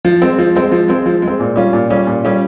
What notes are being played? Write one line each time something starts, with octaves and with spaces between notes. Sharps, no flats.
F3
G#3 C4
F3
G#3 C4
F3
G#3 C4
F3
G#3
C4
A#2
G3 C#4 F4
A#2
G3 C#4 F4
A#2
G3 C#4 F4